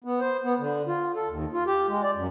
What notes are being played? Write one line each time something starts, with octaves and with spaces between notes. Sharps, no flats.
B3
C5
B3
D3
F4
A4
D#2
F4
G4
G#3
D5
F#2